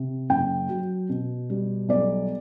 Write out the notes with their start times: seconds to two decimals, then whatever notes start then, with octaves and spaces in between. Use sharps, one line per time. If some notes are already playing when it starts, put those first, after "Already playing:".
Already playing: C3
0.30 F#1 G5
0.69 F#3
1.09 B2
1.50 G3
1.89 B1 D5